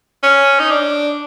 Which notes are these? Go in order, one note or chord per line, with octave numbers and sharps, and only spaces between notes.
C#4
D#4
D4